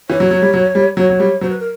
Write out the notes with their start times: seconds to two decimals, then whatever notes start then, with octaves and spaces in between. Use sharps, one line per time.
0.09 E3 C#5
0.20 F#3
0.31 F#3
0.42 G3
0.54 F#3
0.75 G3
0.97 F#3 C#5
1.10 F#3
1.20 G3
1.41 F#3 C5
1.50 B4
1.60 A#4